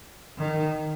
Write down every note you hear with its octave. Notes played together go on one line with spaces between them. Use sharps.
D#3